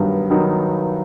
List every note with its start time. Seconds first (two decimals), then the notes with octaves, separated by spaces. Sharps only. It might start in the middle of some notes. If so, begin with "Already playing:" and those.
Already playing: G2 D#3 F#3 B3 D#4
0.30 D#3 F#3 B3 D#4